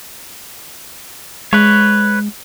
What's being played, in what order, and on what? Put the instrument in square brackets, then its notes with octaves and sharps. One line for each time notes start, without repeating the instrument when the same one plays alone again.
[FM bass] G#3 [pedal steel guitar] B4 C#5